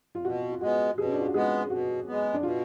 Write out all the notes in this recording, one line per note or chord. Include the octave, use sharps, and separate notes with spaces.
F4
B2 F#4
F4
G#3 B3 F#4
B2 G#4
C#4
D4
F4
F#4
G#3 B3 G#4
B2 F#4
G#3 B3
D4
B2 F4